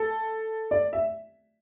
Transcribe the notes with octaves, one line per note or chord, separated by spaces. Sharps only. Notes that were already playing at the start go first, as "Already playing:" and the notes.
Already playing: A4
D5
E5